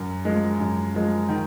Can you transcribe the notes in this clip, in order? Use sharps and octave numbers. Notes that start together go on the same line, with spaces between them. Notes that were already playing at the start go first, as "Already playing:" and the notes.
Already playing: F#2
F3 G#3
F#2
F3 G#3
D#3